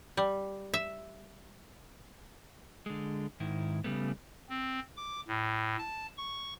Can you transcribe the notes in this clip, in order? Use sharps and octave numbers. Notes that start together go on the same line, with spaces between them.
G3
E5
D3 G#3
G#2 D#3 E4
C#3 G3 A3 B3
C4
D6
A2
A5
C#6